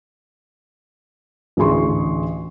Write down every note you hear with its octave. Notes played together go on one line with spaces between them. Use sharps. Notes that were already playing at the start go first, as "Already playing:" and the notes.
A1 D2 D4 G#4 C6 C#6